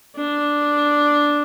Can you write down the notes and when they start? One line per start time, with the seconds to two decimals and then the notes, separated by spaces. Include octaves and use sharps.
0.16 D4